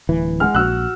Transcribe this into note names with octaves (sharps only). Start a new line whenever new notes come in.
D1 E3
G#3 F#5 F6
A#1 F#4 E6 F#6